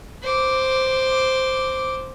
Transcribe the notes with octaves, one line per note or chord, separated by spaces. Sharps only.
C5 D6